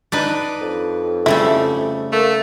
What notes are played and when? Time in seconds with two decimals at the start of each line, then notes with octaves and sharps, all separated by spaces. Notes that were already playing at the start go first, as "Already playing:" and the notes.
0.12 D4 D#4 B4
0.61 F2
1.26 C#3 G3 A3 E4
2.12 A3 A#3